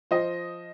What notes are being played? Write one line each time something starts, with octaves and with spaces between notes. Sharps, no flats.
F3 C5 D#5